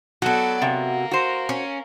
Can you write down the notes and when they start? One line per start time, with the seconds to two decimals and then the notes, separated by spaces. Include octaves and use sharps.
0.22 F#3 B3 F#4 A4 D5
0.62 C3 A#3
1.11 F#4 C5
1.49 C#4